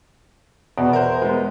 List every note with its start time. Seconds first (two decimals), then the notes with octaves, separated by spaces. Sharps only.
0.78 E2 B2
0.93 A#4 C5
1.22 G#3 B3